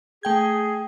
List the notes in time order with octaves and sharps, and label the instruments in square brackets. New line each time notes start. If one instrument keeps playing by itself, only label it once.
[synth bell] A3 G5 G#6 [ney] G#4